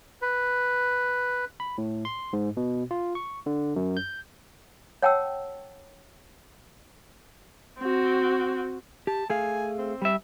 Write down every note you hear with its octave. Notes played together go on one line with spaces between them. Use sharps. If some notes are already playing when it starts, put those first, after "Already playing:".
B4
B5
A2
C6
G#2
B2
F4
C#6
D3
F#2
G6
C#5 F#5 G5 A5 E6
C4 F#4
G4 A5
A3 G#4 F5 G#5
C4
G3 E5